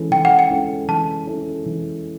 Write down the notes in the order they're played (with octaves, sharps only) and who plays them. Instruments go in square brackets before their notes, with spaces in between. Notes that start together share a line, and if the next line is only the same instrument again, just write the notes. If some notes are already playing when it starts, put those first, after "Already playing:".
Already playing: [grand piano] E3 G#3 C#4 E4 A4
[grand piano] E3 [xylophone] G5
[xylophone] F#5
G5
[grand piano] G#3 C#4 E4 A4
[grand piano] E3 [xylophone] A5
[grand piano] G#3 C#4 E4 A4
E3